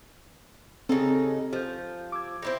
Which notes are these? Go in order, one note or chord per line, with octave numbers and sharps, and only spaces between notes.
C#3 C4 D#4 G4 A4
F3 G4 G6
D6 E6 G#6
C4 E4 G4 A#6